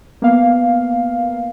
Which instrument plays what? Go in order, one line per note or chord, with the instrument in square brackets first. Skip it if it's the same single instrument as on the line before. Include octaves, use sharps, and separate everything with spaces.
[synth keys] A#3 B3 F5